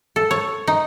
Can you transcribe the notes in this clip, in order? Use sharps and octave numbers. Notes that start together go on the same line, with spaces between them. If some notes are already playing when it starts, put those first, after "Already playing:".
A4
C#5
D#4